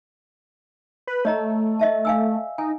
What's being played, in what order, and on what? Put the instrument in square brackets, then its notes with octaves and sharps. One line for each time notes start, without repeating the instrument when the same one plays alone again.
[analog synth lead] B4
[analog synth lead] A3 [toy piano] C#5 D#5 A#5
[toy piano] D#5 E5 A5
F5 G#5 E6
[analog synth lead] D#4 [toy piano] G#5